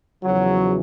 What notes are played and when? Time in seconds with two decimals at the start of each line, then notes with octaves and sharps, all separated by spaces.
0.23 E2 C#3 F3 F#3